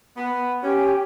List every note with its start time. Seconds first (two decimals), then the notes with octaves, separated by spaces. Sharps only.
0.17 B3
0.62 C#4 G4